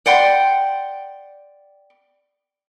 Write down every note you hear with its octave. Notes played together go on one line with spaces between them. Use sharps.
D5 F#5 G5 C6